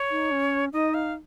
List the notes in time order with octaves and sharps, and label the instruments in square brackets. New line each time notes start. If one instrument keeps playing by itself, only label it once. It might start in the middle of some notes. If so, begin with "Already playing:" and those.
Already playing: [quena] C#5
[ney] D#4
C#4
[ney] D#4 [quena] D#5
[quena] F5